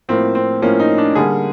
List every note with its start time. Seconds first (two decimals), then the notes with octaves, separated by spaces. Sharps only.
0.08 A2 F3 A#3 C4
0.35 C4
0.62 A2 F3 A#3 C#4
0.80 D#4
0.98 D4
1.15 D3 G3 A#3 G#4